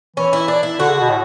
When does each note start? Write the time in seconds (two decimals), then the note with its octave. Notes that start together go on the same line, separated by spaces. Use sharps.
0.16 E3 C#4
0.33 E4
0.48 D4
0.63 E4
0.79 D3 F#4
0.89 C#3
1.00 B2
1.09 A2